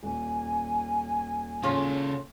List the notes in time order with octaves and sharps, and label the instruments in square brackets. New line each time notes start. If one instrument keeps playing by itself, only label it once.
[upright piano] D#1 [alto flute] G#5
[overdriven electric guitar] C#3 A4 [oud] C#4 F4